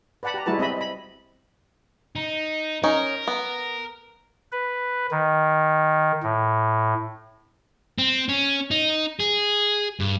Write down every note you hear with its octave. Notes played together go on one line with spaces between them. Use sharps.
B4 D5 F#5 A5 B5
G4 A#5
G3 G#3 E4 F#4 B4 A5
C4 D#5 E5 B5
D#5 B5
D#4
C#4 D#4 A#4
B3
B4
D#3
A2
C4
C#4
D#4
G#4
G2